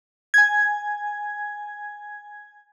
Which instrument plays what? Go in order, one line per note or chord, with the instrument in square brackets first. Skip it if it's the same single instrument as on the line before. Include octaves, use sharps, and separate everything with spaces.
[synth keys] G#5 G#6